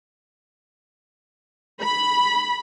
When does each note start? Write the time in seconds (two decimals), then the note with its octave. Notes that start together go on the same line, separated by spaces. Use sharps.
1.81 B5